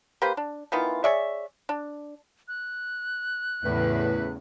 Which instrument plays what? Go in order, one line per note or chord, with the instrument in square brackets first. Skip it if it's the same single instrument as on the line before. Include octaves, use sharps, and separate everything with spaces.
[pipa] A#3 G4 B4 C5
D4
D#3 E3 B3 F4
G#4 C#5 D5 E5
D4
[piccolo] F#6
[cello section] E2 C#3 [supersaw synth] A2 [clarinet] B4